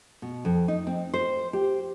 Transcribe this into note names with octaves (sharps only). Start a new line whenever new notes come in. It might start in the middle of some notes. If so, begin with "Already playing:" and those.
B2
F2
D#4
C4
C5
G4